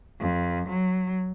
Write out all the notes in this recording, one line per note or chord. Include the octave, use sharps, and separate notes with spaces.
F2
F#3